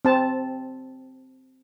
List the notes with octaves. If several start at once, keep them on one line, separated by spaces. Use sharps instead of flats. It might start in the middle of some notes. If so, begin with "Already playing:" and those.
C4 A5